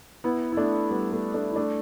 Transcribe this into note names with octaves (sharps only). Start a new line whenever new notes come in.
B3 E4
E4
A3 D4
G3 B3
A3
A3 D4
E4
A3 D4